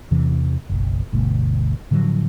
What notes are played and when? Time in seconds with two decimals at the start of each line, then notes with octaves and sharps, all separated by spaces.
0.11 E2 C3 E3
0.70 F#1 B1
1.13 G1 D2 B2 A3
1.91 A2 D3 F3 F#3